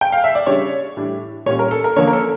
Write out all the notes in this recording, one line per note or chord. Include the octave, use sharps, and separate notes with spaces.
G5
F5
E5
D5
C#3 G3 D4 C#5
A2 G3 D4
A#2 G3 C#4 C#5
A#4
A4
A#4
D3 F3 A#3 C#4 C#5
A#4
A4